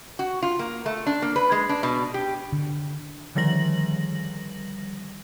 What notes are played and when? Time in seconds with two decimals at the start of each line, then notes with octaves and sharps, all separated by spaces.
0.19 F#4
0.43 F4
0.59 A#3
0.86 A3
1.07 D4
1.22 A#3
1.36 B4
1.52 G#3
1.69 D4
1.83 B2
2.14 G4
2.52 D3
3.35 D3 D#3 F3 G3 A#6 F#7